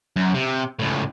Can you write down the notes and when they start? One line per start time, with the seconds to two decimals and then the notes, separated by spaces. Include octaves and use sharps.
0.16 F#2
0.34 C3
0.79 C#2 A2